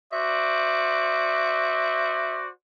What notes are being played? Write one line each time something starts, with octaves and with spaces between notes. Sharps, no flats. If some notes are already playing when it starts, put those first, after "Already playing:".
F#4 C5 D5 E5